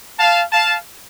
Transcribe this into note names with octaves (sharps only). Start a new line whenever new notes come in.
F5 A5
F5 A5